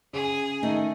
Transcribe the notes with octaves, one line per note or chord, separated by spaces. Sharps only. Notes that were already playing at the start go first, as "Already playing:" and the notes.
C#3 G#4
D#3 A3 D#4